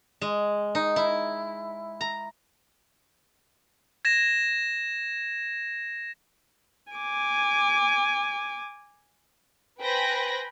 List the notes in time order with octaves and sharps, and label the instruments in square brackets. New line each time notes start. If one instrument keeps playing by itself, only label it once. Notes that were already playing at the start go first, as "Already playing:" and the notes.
[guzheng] G#3
D#4
E4
A#5
[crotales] G#6 A#6 E7
[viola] G#5 D6
[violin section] B4 C5 G5 G#5 B5 A#6